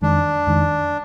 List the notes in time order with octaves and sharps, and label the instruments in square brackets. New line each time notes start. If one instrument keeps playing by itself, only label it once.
[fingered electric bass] F2 D#3 G#3 [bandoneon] D4
[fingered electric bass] F2 D#3 G#3